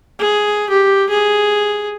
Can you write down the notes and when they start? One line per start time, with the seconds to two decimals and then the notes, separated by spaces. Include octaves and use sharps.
0.19 G#4
0.69 G4
1.10 G#4